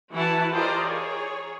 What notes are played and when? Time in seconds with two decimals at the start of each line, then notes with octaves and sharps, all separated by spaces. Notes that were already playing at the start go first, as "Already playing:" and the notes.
0.11 E3 E4 F#4 B4 F#5 A5
0.52 F4 G4 A#4 C5 D5 D#5
0.83 G#4 C#5